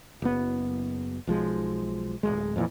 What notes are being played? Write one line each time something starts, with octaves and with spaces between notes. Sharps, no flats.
F#1 B3
B1 F3 G#3
D1 G1 G#3
F2 A#2 E3